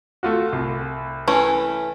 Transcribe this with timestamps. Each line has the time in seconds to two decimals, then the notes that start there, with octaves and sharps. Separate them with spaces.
0.23 A3 F4 F#4
0.53 C2
1.28 E3 A3 C#4